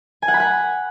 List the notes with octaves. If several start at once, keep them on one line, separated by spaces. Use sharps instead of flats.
G#5
F#5
B5
F#5